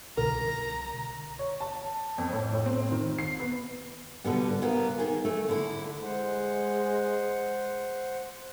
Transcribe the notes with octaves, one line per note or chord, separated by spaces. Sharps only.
C2 B2 D3 A#4 A#5
C#5
A5
F2
A2
A2
C4
D#3
C7
B3
B2 D3 G3 B3
C#3 G3 B3 A#4
D#3 G#4
A3
D3 E4
G#3 C5 F#5